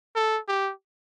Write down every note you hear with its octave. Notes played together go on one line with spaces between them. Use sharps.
A4
G4